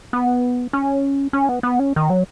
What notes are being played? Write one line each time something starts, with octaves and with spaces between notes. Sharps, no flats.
B3
C#4
C#4
B3
B3
C#4
D#3
F#3